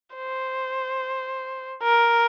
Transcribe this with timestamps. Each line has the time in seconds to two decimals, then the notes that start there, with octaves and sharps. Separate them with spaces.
0.16 C5
1.83 A#4